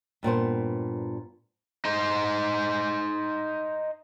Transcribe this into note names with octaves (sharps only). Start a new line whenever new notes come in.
G2 A#2 B3 C5
D#4 C5